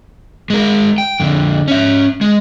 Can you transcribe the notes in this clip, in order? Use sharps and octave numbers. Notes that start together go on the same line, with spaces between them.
G#3 A#4
G5
F2 D3
C#4 E5
G#3